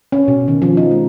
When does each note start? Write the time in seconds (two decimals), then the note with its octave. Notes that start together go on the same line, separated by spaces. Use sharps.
0.12 C#4
0.28 B2
0.48 D#3
0.62 F3
0.77 D#4
0.91 G#3